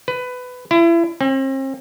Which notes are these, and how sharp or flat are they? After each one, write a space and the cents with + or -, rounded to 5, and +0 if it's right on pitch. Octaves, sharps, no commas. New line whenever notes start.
B4 +15
E4 +30
C4 +40